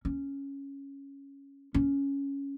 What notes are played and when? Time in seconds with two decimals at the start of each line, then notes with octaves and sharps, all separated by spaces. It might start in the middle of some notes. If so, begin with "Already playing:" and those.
0.05 C#4
1.74 C#4